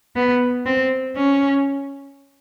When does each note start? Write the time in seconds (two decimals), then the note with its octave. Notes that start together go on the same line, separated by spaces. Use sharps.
0.16 B3
0.66 C4
1.16 C#4